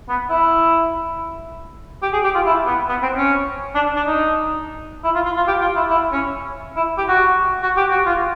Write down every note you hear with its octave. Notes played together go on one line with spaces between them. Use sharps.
B3
E4
G4
G#4
G4
F4
E4
B3
B3
C4
C#4
D4
D4
D#4
E4
F4
F4
F4
G4
F4
E4
E4
C#4
E4
G4
F#4
F#4
G4
F#4
F4